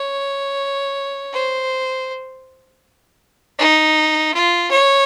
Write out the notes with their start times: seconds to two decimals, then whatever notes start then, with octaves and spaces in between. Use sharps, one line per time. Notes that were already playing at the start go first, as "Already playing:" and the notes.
Already playing: C#5
1.33 C5
3.59 D#4
4.34 F4
4.71 C#5